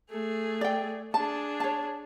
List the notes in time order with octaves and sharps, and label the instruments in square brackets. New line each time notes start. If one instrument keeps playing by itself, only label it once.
[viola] A3 G#4
[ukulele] D5 G5
[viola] D4 G#4 [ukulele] A5
[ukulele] C#5 A5